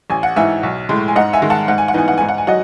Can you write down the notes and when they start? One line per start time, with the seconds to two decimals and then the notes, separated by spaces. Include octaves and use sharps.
0.10 A1 G#5
0.23 F#5
0.36 G#2 E3 E5 G#5
0.63 B1
0.89 A2 G#3
1.08 G#5
1.16 G#2 D#5 F#5
1.33 E5 G#5
1.42 D#3 G#3
1.50 F#5 A5
1.68 G#2 F#5
1.78 G#5
1.88 F#5
1.94 E3 B3 D#4 G#5
2.08 F#5
2.18 G#2 G#5
2.29 F#5
2.38 G#5
2.47 F#3 D#5 F#5